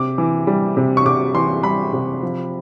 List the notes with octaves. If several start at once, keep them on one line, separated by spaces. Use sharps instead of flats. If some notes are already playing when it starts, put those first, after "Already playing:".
Already playing: C3 D6
E3
G3
C3
C#6
C3 D6
E3 C6
G3 B5
C3
F3